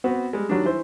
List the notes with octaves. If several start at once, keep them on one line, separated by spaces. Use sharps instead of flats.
B3 C4 F#4
G3 G#3
D#3 F#3 G3 D4
E3 E4 C5